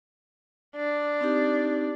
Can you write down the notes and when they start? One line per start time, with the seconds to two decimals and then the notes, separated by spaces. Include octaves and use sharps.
0.76 D4
1.21 C4 D#4 G4